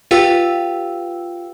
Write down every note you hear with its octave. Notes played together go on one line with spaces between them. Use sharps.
F4 G4 B4 F5 G5 E6